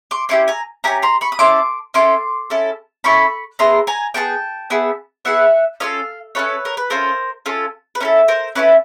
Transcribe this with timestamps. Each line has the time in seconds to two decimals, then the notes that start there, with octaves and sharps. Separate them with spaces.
0.11 C6 D6
0.29 C#4 E4 G4 C6 D6
0.48 G#5 A#5
0.84 C#4 E4 G4 G#5 A#5
1.02 A#5 C6
1.21 B5 C#6
1.32 D#6
1.39 C#4 E4 A4 C6 D6
1.94 C#4 E4 A4 C6 D6
2.50 C#4 E4 A4
3.04 C#4 E4 A4 B5 C#6
3.59 B3 E4 G#4 A#5 C6
3.87 G#5 A#5
4.14 B3 E4 G#4 G5 A5
4.70 B3 E4 G#4
5.25 B3 E4 G#4 E5 F#5
5.80 C#4 F4 A4 D#5 F5
6.35 C#4 F4 A4 B4 C#5
6.65 A#4
6.77 B4
6.90 C#4 F4 A4 A#4 C5
7.46 C#4 F4 A4
7.95 B4
8.00 C#4 E4 A4 A#4
8.28 A#4 C5
8.55 C#4 E4 A4 B4 C#5